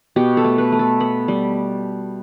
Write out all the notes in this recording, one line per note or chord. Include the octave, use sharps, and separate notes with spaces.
B2 G4
A4
A3
B4
A3
A4
B3 B5
G3